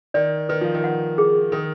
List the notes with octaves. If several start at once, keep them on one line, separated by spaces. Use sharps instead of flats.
D#3 D5
D#3 B4
F3
D#3
F#5
G#4
D#3 A#4